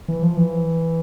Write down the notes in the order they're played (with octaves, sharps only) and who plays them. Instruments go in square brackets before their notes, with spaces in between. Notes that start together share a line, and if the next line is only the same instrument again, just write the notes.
[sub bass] E3
F3
E3